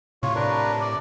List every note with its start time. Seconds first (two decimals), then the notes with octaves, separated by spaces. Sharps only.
0.23 A2 C3 F4 C#5
0.36 D4 A#4 B4
0.81 D5